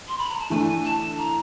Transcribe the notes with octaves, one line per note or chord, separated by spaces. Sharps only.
C6
B5
A#5
A5
E3 A3 D4 G#5
A5
A#5